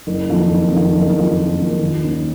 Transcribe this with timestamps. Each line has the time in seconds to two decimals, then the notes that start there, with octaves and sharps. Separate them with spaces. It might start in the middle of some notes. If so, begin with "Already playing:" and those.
0.07 F#1
0.29 F2 D#3 A#3 F4
0.50 F#1
0.72 F2 D#3 A#3 F4
0.94 F#1
1.16 F2 D#3 A#3 F4
1.38 F#1
1.59 F2 D#3 A#3 F4
1.81 D#2
2.02 D#3 A#3 C#4